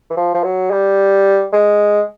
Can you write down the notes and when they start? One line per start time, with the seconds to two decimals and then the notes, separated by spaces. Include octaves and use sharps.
0.10 E3
0.17 F3
0.34 F3
0.44 F#3
0.71 G3
1.53 G#3